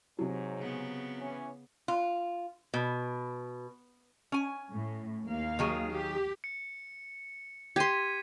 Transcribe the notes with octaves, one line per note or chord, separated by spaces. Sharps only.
G#2 C3 F#3 C#5
C#3 B3
E3 C#4
F4
B2
C#4 G#5
A2
D#2 A#3 F5
D#3 F#3 G#4
G4
C#7
G4 C6 G#6 B6 D#7